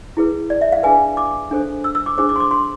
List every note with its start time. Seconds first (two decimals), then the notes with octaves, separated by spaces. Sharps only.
0.17 E4 G#4 B4
0.50 D5
0.61 E5
0.72 F5
0.83 D4 G#4 B4 G#5
1.17 D6
1.51 D4 A4 C5
1.84 E6
1.95 E6
2.06 D6
2.18 D4 G#4 C5 D6
2.29 D6
2.36 C6
2.40 D6
2.51 C6